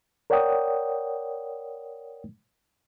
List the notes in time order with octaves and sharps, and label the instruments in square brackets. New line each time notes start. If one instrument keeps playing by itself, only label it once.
[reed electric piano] A#4 C#5 D5 F#5 G5 D#6